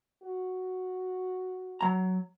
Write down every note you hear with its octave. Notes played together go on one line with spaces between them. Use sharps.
F#4
F#3 A#5